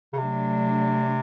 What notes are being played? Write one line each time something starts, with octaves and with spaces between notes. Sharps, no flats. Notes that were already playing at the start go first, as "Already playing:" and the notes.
C#3
C3 F#3 A3 D4